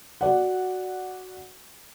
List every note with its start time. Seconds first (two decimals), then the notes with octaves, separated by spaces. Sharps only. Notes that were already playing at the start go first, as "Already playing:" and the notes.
0.21 F#4 D5 F#5